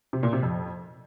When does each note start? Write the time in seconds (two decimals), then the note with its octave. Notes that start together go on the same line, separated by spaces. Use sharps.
0.13 C3
0.23 A#2
0.33 C3
0.43 F2